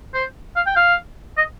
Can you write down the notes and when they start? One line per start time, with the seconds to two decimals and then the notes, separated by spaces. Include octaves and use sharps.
0.14 C5
0.56 F5
0.67 G5
0.76 F5
1.37 D#5